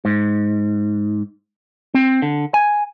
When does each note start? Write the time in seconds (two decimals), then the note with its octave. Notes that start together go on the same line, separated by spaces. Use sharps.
0.05 G#2
1.94 C4
2.22 D3
2.54 G#5